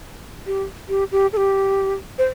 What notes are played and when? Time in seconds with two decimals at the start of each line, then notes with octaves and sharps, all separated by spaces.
0.47 G4
0.89 G4
1.12 G4
1.33 A4
1.37 G4
2.18 C5